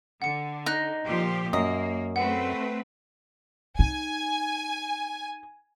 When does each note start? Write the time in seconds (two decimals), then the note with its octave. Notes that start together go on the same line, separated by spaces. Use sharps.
0.22 D3 F#5 C#7
0.66 D#4 F#6 A#6
1.05 A#2 F3 G4
1.53 F#2 A#3 D#5
2.16 A3 C4 B4 F#5
3.79 D#4 G#5